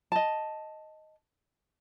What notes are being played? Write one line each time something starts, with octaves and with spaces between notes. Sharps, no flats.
D#5 A5